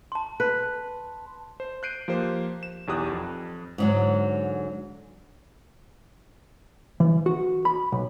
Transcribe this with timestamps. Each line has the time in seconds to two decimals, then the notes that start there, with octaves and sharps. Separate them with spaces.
0.12 A5 C6
0.40 B4
1.60 C5
1.83 F#6 G6 C7 D7 D#7
2.08 F3 A#3 G4 C5
2.63 E7
2.87 B1 E2 G4 D#6 F#6
3.12 F2
3.78 G#2 D3 F#3
7.00 E3
7.26 F#4
7.65 B5
7.92 B1